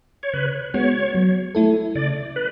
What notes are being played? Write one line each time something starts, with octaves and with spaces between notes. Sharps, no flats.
C#5
C#3 B4
G#3 B3 F#4 C#5
F#3
A3 E4 A4
C#3 D5
B4